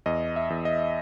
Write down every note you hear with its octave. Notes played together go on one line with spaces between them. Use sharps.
E2 D#5
E5
E2
D#5